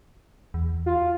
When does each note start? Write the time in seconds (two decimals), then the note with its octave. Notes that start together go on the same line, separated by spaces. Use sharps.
0.54 E2
0.86 F4